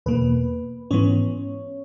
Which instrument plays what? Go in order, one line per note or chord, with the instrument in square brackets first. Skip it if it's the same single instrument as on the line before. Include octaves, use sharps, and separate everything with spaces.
[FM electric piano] E2 B2 A#3 B4
G#2 E3 B3 C#4 C#5